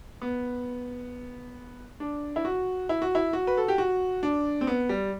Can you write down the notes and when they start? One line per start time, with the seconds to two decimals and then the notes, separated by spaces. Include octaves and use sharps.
0.22 B3
2.00 D4
2.36 E4
2.45 F#4
2.89 E4
3.02 F#4
3.15 E4
3.33 F#4
3.47 B4
3.57 A4
3.68 G4
3.78 F#4
4.23 D4
4.61 C4
4.67 B3
4.89 G3